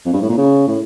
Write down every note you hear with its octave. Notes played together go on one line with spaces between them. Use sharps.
F2
G2
A2
A#2
C#3
A2